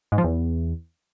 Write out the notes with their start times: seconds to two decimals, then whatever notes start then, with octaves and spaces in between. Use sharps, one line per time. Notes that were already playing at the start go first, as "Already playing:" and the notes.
0.12 G#2
0.18 F3
0.24 E2